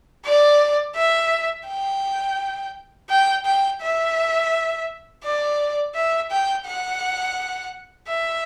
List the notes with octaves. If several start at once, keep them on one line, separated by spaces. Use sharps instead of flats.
D5
E5
G5
G5
G5
E5
D5
E5
G5
F#5
E5